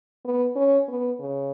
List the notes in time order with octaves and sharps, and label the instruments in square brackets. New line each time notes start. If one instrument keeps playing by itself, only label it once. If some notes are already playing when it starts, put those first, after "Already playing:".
[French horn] B3
C#4
B3
C#3